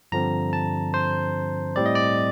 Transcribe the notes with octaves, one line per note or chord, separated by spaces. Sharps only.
G2 D3 F3 C4 A#5
A5
C5
A2 G3 C4 D5
D#5
D5